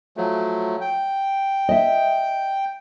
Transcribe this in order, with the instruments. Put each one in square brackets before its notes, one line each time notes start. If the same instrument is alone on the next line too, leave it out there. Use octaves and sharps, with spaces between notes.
[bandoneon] F3 F#3 A3
G5
[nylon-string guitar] D#5 E5